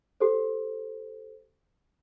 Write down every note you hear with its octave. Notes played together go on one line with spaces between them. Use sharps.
G4 A4 C5